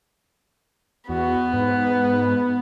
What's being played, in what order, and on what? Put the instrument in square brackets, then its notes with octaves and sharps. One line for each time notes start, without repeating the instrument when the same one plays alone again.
[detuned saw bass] E2 [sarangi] B3 [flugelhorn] F#4
[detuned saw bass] G#2 [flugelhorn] B4